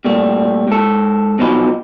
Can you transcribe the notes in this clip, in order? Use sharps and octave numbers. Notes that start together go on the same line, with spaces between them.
A#2 G3 A3
G#2 A4
B2 F3 F#3 D#4 B5